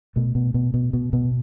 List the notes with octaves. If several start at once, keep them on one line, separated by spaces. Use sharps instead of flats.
B2 A3
B2
B2
B2
B2
B2